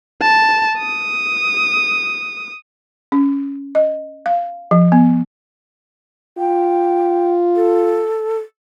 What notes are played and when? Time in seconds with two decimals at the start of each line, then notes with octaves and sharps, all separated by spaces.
0.22 A5
0.78 D#6
3.12 C#4
3.75 D#5
4.26 F5
4.71 F3
4.92 B3
6.38 F4 G5
7.56 A4